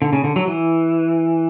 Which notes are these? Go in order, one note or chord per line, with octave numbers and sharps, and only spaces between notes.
D3
C#3
D3
F#3
E3